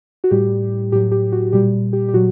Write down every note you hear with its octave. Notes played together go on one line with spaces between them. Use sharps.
F#4
A2 G3 G4
A2 F#3 G4
G4
F#4
A#2 G3 G4
G4
G4
A#2 F#3 F#4